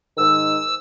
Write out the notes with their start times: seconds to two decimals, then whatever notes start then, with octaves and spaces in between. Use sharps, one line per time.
0.17 G#2 D#3 E6